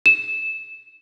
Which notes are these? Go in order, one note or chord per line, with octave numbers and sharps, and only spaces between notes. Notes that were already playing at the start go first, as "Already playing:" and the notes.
E7